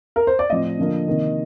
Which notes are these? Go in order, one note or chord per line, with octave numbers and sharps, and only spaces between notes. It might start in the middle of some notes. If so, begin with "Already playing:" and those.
A#4
C5
D5
A2 F3 C4 D#5
D3 F3 A#3
C3 D#3 A#3